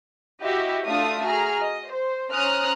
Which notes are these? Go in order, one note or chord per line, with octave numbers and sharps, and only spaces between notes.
E4 F#4 G4 D#5 E5
A3 D4 F4 E5 F5 D#6
F#4 G#4 A#5 F6
D#5
C5
C#4 C5 A#5 D#6 F6 F#6